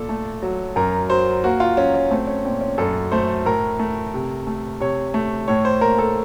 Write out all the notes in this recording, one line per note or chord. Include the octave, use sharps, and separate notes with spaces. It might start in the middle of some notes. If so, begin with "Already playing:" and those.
Already playing: A#2 A4
A3
F#3
F#2 A#4
F#3 C5
A#3 F#4
F4
F#3 C#4
C#4
A3 C4
C#4
A#2 C4
C#4
F#2 A4
A3 C5
A2 A#4
A3
C3
A3
C3 C#5
A3
A2 C#5
C5
A#3 A#4
A4